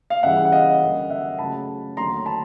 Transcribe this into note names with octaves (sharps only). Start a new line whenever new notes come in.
F5
C#2 C#3 E3 G3 E5 F#5
F#5
D#5 F5
F#2 D3 G3
E5 F#5
C#2 C#3 F#3 A3 A5 B5
D#2 D3 F#3 A3 A#5 C6
A5 B5